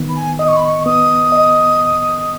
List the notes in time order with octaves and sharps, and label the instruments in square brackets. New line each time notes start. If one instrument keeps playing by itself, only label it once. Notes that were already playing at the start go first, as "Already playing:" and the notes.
Already playing: [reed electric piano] D#3 B3
[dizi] B5
G#5
[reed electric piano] D#5 [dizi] D#6
[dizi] C#6
B5
C#6
C#6
[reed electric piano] B3 [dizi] D#6
[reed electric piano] D#5